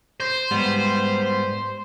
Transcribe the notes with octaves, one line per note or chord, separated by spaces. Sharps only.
C5
G#2 G3 B3